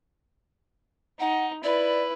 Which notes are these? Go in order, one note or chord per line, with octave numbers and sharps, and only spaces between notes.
D#4 F#5
E4 B4 D5